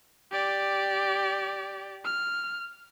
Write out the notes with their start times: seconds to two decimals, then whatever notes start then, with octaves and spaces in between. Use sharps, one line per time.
0.32 G4 D5
2.05 F6